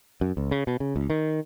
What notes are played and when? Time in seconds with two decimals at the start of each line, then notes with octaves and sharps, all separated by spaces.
0.21 F#2
0.37 C#2
0.51 C#3
0.67 B2
0.80 C#3
0.96 C#2
1.10 D#3